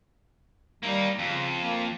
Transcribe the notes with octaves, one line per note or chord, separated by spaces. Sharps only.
G3 A#3 D#4
F2 C#3
A#3